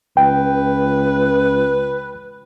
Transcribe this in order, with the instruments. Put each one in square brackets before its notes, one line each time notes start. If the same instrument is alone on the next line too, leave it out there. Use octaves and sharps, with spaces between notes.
[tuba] C#2 [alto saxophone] B4 [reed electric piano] G5